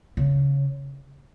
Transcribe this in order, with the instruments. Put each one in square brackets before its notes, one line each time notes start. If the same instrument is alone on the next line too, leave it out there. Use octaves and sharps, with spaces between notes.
[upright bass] C#3